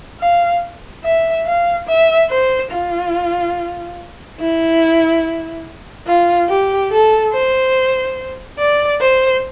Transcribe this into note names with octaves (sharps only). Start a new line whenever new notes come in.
F5
E5
F5
E5
C5
F4
E4
F4
G4
A4
C5
D5
C5